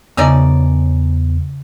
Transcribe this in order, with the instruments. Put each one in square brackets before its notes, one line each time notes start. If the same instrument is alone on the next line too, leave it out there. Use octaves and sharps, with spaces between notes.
[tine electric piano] E2 [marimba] C#3 C#6 [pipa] C#4 D#4 D5